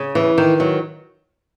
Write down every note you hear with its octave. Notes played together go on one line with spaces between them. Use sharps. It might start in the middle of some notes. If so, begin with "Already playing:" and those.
Already playing: C#3
E3
D#3
F#3